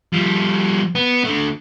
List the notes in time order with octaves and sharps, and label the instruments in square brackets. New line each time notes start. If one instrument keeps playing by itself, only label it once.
[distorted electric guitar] F3 G3
B3
D3 A3